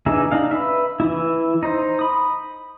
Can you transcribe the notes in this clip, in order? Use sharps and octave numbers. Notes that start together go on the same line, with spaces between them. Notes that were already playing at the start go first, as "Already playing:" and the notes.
E3 D4 D#4 G#4 E5
D4 D#4 F5
B4 E5
E3 E4
D#4 C5
B5 D#6